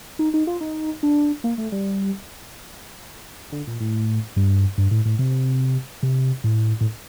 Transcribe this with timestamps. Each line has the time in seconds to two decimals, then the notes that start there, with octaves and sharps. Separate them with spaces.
0.19 D#4
0.34 D#4
0.47 F4
0.61 D#4
1.03 D4
1.44 A#3
1.58 A3
1.72 G3
3.52 D3
3.67 A#2
3.80 A2
4.36 G2
4.78 G2
4.91 A2
5.05 A2
5.19 C3
6.03 C3
6.44 A2
6.81 A2